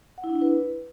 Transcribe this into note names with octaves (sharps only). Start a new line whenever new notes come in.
F#5
E4
D4
E4
B4